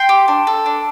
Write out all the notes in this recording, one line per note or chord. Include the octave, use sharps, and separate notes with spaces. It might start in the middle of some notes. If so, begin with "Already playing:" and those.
Already playing: G5 C6
G4
D4
A4
D4